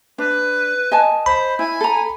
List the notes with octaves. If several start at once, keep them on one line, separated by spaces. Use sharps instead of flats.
D4 B4
D#5 G#5 A5
C5 B5
E4 G#5
A4 A#5